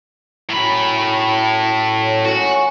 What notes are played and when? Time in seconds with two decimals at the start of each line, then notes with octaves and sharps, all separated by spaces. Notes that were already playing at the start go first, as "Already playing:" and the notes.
0.49 F#2 A2 A#5 B5
1.96 F#3
2.25 D#3 G#3 C#4 F#4